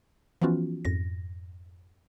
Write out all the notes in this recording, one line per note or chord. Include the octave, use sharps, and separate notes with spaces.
E3 F3 B3 C#4 F4 F#4
F2 G#2 A#6